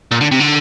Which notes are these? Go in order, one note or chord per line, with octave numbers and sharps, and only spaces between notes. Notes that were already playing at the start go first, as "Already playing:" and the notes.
A#2
D3
C3
D3